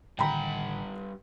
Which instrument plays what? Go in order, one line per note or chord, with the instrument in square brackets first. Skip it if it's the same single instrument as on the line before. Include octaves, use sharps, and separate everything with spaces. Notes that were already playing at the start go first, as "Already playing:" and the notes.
[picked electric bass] A1 D3 D#3 [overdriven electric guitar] G2 F#5 [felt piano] G5 A#5 B5